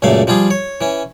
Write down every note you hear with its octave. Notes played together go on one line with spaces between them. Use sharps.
C#2 F#2 A#2 A3 F5
F3 G3 F4 G#4
C#5
E3 C#4